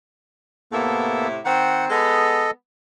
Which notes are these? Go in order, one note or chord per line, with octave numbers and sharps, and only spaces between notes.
A2 C3 A#3 B3 E4 A4
D#3 C4 F#5
G#3 B3 A4 D#5